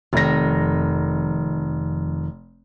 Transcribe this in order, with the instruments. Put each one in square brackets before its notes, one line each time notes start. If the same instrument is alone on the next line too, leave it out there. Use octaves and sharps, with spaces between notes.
[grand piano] F1 A#6 [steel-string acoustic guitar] F2 D#3